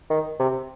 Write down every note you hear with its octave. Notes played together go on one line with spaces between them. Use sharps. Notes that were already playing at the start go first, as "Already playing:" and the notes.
D#3
C3